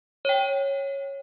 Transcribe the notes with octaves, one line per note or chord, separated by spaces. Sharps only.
C#5 G5